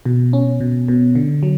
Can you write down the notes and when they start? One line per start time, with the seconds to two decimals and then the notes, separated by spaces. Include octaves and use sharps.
0.05 B2
0.33 C#4
0.60 B2
0.88 B2
1.15 D3
1.43 F#3